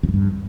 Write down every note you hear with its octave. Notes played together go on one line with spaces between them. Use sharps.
E2
F#2
G2